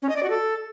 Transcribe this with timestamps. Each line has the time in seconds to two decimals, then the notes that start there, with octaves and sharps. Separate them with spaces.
0.02 C#4
0.09 D#5
0.16 D5
0.23 F#4
0.30 A4